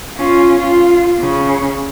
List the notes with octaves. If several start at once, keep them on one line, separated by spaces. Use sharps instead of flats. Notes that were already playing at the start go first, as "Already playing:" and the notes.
C#4 F4
F4
C#3